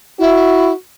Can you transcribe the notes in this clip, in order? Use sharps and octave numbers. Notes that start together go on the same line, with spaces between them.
E4 F#4